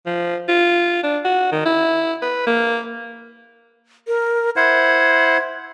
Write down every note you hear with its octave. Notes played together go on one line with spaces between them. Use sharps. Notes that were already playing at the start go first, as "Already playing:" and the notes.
F3
F4
D4
F#4
D#3
E4
B4
A#3
A#4
E4 C5 F#5 G#6